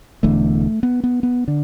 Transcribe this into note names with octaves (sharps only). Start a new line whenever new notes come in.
E1 E2 D3 A3
B3
B3
B3
D3